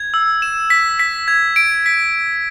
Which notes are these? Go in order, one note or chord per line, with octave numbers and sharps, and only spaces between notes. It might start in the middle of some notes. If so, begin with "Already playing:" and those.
Already playing: G#6
E6
E7
B6
B6
G#6
D7
B6